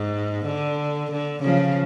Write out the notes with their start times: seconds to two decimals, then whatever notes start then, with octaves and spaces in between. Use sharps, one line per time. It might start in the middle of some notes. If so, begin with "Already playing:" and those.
Already playing: G#2
0.46 D3
1.12 D3
1.43 C#3 F3